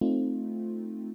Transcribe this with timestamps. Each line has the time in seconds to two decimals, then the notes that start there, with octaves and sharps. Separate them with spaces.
0.01 A3 C4 D#4 F4